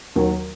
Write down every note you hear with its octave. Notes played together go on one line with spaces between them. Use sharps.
D#2 D#3 F#3